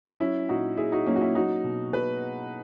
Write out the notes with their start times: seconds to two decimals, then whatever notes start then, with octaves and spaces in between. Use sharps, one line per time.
0.20 F#3 C#4 E4
0.49 A#2 D#4 F#4
0.77 A#2 E4 G#4
0.92 D#4 F#4
1.06 F#3 A#3 C#4
1.16 F#4
1.21 C#4 E4
1.35 F#3 D#4 F#4
1.64 B2
1.93 B2 B4